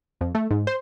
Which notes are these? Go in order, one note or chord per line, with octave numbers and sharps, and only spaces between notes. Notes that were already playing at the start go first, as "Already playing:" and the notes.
F2
A3
G#2
C5